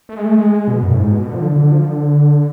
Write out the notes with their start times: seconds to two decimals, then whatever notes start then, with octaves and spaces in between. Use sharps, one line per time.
0.09 A3
0.17 G#3
0.25 A3
0.38 G#3
0.68 B2
0.83 F#2
0.92 A2
0.98 G#2
1.12 B2
1.27 D3
1.35 F3
1.42 D3
1.56 D3
1.72 F3
1.86 D3